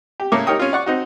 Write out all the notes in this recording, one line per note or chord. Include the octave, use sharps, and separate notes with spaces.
G4
A2 C#3 A#3 C#5 D6
D#4 G4 A#4 C#5 G5 D#6
C#4 F4
D5 F#5 C#6
C4 D#4 F#4